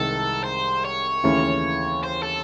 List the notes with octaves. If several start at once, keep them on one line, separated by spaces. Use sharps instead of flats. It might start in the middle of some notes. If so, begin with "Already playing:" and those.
Already playing: C2 C3 D#3 G#3 A4
C5
C#5
D#2 C#3 E3 A3 C#4
C5
A4